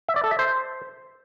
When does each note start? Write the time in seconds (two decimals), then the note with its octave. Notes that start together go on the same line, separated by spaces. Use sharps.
0.09 E5
0.16 D5
0.24 A4
0.31 E5
0.39 C5